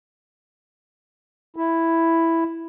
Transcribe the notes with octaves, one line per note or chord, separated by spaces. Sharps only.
E4